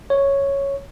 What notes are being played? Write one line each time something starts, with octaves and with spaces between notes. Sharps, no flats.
C#5